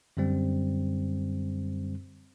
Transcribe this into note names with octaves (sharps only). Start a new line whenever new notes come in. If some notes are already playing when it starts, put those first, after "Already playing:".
F#2 D3 G3 C4